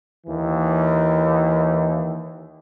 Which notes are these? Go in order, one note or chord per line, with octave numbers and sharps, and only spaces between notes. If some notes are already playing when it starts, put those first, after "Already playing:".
D#2 E3